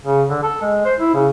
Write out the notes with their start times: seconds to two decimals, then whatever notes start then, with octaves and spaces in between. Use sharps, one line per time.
0.05 C#3
0.29 D3
0.43 A4
0.61 G#3
0.85 C5
0.99 E4
1.14 C#3